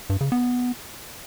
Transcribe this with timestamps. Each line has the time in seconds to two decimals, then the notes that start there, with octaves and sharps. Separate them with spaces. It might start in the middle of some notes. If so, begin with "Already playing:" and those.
0.10 G2
0.21 C#3
0.32 B3